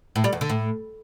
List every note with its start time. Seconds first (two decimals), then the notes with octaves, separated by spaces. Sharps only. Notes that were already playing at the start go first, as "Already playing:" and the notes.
0.16 A2
0.24 G3
0.33 E2
0.41 D3
0.50 A2